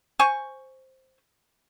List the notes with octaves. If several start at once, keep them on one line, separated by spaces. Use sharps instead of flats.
C5 G#5 C#6